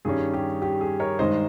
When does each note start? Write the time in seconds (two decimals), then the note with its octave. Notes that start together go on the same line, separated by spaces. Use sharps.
0.05 G2 D#3 G3 C#4 G#4
0.34 G4
0.62 G4
0.81 G#4
1.00 A#4 C#5
1.19 G2 D#3 G#3 D#4 C5 D#5